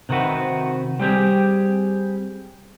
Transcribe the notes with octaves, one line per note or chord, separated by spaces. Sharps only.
C3 D#3 C4 F#4 B4
G3 C4 G4 G#4